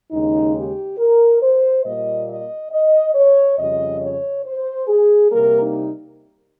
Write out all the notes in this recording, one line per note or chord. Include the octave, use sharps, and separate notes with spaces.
D#2 C#3 G#3 D#4
G4
A#4
C5
A#2 G3 A#3 D#5
D#5
D#5
C#5
F2 C#3 G3 D#5
C#5
C5
G#4
C3 G3 A#3 A#4
D#4